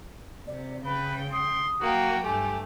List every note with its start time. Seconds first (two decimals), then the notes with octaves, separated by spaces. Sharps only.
0.47 C3 D5
0.85 C#3 B4 G5 B5
1.32 C6 D#6
1.81 F#3 A#3 F#4 G5
2.24 G2 A3 G4 G#5